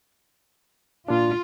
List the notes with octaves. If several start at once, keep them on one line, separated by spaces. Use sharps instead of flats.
A#2 D4 F4